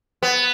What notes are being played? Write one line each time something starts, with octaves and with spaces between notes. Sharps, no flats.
B3